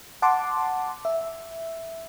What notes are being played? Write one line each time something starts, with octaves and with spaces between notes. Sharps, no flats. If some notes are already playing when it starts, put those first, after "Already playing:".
F#5 A5 C6 D6
E5